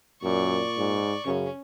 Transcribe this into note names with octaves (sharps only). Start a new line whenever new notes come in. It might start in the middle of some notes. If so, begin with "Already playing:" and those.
F#2 A#2 D5 C#6
G#2
F#2 C#3 C#4